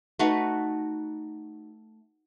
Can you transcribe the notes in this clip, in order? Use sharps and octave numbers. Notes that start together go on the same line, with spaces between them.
A3 D#4 F#4 B4